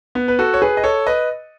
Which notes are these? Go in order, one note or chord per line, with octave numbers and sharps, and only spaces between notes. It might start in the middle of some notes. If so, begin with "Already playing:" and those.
B3
B4
F#4 A4
C#5
G#4 B4
D#5
A4 C#5
B4 D#5